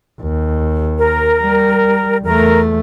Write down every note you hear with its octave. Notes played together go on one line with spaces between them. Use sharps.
D#2
A#4
G3
E2 A3 A#4